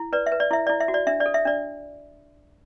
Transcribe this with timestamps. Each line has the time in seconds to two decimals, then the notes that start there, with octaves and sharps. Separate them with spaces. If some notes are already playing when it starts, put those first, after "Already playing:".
Already playing: E4
0.13 B4 D5
0.26 E5
0.32 B4
0.40 D5
0.51 E4 E5
0.67 E4 D5
0.80 E5
0.88 F#4
0.94 D5
1.07 D4 E5
1.20 D5
1.26 A4
1.34 E5
1.45 D4 D5